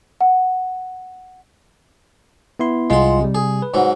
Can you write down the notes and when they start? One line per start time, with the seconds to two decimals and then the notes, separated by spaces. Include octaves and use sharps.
0.21 F#5
2.59 B3 E4 C6
2.90 C2 G#3 F4 F#5 C6
3.20 C3 G3
3.35 G#4
3.62 B4
3.74 G#2 F#3